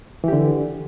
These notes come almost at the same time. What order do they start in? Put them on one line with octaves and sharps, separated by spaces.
E3 G4 D3